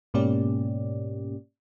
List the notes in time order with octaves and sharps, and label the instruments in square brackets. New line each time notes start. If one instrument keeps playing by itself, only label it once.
[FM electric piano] G#2 B2 A#3 C#4 G4 D5